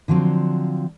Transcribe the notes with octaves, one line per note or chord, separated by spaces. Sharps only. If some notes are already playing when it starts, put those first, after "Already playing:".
D3 F3 F#3 C4